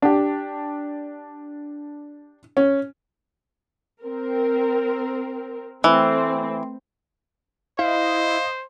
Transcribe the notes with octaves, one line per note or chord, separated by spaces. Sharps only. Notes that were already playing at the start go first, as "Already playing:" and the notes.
D4 G4
C#4
C4 A#4
E3 A3 C4
E4 C5 D#5 F5